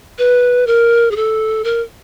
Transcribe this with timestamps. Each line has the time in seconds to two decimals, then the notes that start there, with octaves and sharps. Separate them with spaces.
0.18 B4
0.67 A#4
1.11 G#4
1.16 A4
1.64 A#4